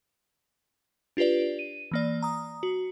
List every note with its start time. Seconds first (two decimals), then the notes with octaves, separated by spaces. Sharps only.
1.17 D4 F4 G4 B4 D5
1.59 D#7
1.91 E3 A#3 D5
2.22 A#5 D#6
2.63 F#4